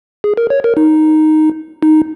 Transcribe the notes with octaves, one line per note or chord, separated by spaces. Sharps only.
G#4
A#4
C#5
A#4
D#4
D#4